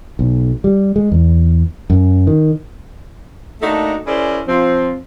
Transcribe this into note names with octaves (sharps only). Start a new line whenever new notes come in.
B1
G3
G#3
E2
F#2
D#3
A3 A#3 D4 D#4 F#4 A4
C#4 E4 G#4 A#4 C5 D5
F3 C4